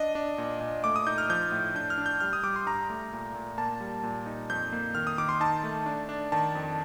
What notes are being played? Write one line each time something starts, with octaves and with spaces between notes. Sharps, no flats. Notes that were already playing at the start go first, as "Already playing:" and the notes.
Already playing: D4 D#5
D4
A#2
A#2
A3 D6
D#6
D#4 G6
F6
F3 G6
A2
D4 G6
F6
D4
G6
G3 F6
D#6
G3 D6
C6
G2 A#5
A3
A#2
A#2
A#3 A5
G3
A#2
D#4
F2 G6
A#3
D#3 F6
D#6
D#3 D6
C6
D#4 A5
A3
D4
D4
D#3 A5
F2